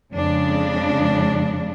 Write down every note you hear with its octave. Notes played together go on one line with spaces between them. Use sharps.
F2 C#3 G#3 D4